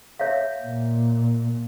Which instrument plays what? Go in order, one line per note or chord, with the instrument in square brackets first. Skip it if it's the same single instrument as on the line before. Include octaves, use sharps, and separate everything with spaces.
[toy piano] C#5 E5 F5
[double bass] A#2